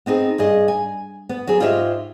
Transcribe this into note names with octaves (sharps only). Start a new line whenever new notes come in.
B3 C4 D#4 G#4
G2 G#4 D#5
G#5
B3
F#3 B3 G#4
G#2 F4 G4 C#5 D#5 E5